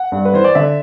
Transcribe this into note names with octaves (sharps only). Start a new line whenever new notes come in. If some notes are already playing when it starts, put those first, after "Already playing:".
Already playing: F#5
G2
B4
E3 C5
D5
D3 E5